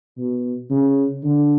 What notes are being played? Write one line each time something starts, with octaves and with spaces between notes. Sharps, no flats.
B2
C#3
D3